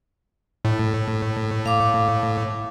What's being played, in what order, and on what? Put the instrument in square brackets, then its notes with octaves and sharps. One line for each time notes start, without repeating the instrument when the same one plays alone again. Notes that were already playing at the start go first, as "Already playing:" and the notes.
[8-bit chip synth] A2
[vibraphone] F5 D6